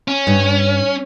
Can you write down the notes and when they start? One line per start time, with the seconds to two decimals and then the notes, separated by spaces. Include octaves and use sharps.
0.08 C#4
0.27 G2